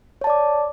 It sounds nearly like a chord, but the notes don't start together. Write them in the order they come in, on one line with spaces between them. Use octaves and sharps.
C#5 A5 D5 D6